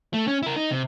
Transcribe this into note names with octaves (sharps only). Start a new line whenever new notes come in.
A3
C#4
E4 A#4
D#4
C3